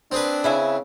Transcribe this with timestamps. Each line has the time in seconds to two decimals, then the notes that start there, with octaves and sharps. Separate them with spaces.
0.12 C4 D4 G#4 B4
0.44 C#3 E4 E5 G#5